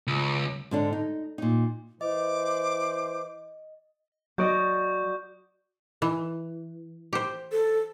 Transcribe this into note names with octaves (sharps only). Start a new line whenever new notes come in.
C#2
G#2 D3 D4
D#4
A#2 D#4
E3 C5 D#5 D6
F#3 F#4 D5 D#5 C#6 G6
E3
G4 C5
A4